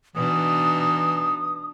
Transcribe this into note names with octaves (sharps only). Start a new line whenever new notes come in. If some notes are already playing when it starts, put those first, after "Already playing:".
B2 E3 D4 D#4 D#6